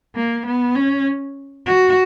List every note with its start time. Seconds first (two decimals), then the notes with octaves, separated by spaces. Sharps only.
0.15 A#3
0.46 B3
0.75 C#4
1.67 F#4